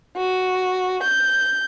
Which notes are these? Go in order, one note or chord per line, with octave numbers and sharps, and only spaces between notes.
F#4
G6